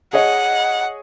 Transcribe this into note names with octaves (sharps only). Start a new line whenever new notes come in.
G#4 C#5 D#5 F#5